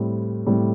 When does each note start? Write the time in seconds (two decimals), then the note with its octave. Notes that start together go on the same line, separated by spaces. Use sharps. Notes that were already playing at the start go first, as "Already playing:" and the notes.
Already playing: A2 G3 C4
0.46 A2 G3 C4